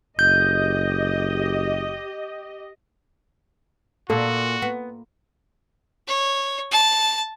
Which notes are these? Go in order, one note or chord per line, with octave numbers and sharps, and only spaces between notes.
F#1 G4 D#5 G6
A#2 A#3 F#4 A4
B3
C#5
A5